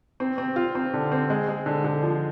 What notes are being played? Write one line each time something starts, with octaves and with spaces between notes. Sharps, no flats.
C4
C4
F4
C4
D3
C4
G#3
G#3
D3
D3
F3